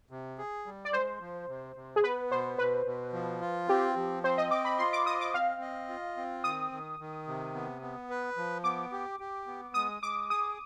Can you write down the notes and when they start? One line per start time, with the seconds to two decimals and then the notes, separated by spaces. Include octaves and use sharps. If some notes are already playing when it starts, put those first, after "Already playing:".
0.11 C3
0.38 G#4
0.66 G3
0.85 D5
0.93 G#3 C5
1.20 F3
1.48 C3
1.76 C3
1.96 G#4
2.04 B3 B4
2.31 B2 C5
2.58 B2 B4
2.86 B2
3.13 F3
3.41 F4
3.68 C4 G4
3.96 F3
4.23 C4 C5
4.38 D#5
4.51 D#5 D6
4.65 B5
4.79 F4 C6
4.93 D6
5.06 D#5 D#6
5.21 D6
5.34 C4 F5
5.61 D#5
5.89 F4
6.17 C4
6.44 D#3 D#6
6.72 D#3
7.00 D#3
7.27 C3
7.54 B3
7.82 B3
8.10 B4
8.37 F3
8.64 B3 D6
8.92 G4
9.20 G4
9.47 B3
9.74 G#3 D#6
10.02 G#3 D6
10.30 G#4 D#6